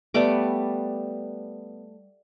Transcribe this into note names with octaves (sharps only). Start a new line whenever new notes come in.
G3 A3 B3 D6